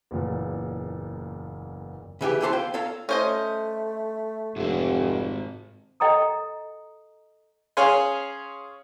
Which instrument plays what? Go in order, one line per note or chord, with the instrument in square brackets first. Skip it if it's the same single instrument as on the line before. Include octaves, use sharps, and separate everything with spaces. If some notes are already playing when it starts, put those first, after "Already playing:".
[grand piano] F#1 E2 A#2
[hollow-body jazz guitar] C#3 E3 G4
E3 A3 A4 B4 C5 A5
F4 F5 G5
A4 C#5 F5 A#5
[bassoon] A3 [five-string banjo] C#4 C5 D#5
[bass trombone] F1 [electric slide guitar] G#2 C4
[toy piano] A4 D#5 G5 A#5 D#6
[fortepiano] C#4 G#4 C#5 F5 G#5 C6